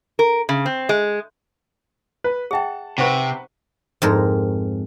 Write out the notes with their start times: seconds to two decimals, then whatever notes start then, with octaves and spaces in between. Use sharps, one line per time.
0.19 A#4
0.49 C#3
0.66 C4
0.89 G#3
2.24 B4
2.51 G#4 E5 F#5 G5 A5
2.98 C3 D#4 B4 C5 F#5 C#6
4.02 F2 G#2 A#4